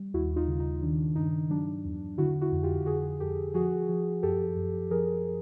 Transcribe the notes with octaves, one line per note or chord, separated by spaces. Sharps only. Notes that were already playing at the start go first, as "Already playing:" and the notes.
Already playing: G3
D#2 E4 F#4
D#4 F4
C#3
D#4
D#3 D4
G2 D#4
F#3 D4
E2
D3 E4 F#4
E4 F#4
F2
F4 G4
D3 F#4 G#4
F2 G4 A4
F3 F#4 G#4
F3
F#2 G4 A4
F#2
F3 G#4 A#4